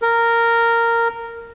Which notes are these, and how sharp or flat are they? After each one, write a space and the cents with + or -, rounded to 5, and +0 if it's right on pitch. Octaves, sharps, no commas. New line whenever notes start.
A#4 -10